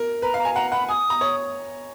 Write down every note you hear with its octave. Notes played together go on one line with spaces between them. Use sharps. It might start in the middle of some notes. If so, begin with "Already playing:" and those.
Already playing: A#4
B4 A#5
F5
A#5
G#5
F#5 A#5
F#5 B5
G#5 D#6
A#5
C#5